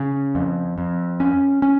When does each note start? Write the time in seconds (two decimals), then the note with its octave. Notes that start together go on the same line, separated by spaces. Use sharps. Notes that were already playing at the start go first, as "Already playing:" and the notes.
Already playing: C#3
0.35 F2
0.78 F2
1.20 C#4
1.62 C#4